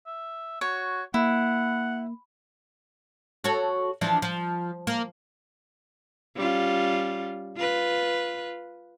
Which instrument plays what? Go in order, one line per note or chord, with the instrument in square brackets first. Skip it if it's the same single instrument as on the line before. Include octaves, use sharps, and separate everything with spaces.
[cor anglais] E5
[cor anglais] F#4 [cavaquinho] C#5
[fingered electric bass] A#3 [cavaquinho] E4 [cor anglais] F#5
[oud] F#4 A4 C#5
E3 F3 D4
F3
A#3
[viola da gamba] G3 C#4 F4
F4 B4